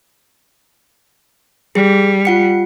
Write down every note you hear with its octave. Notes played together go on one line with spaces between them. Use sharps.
G3 G#4
F4 F#5 C#7